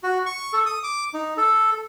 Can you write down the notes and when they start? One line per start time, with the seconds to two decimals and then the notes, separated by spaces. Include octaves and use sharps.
0.03 F#4
0.26 C#6
0.53 A4
0.66 D#6
0.83 D6
1.14 D#4
1.37 A4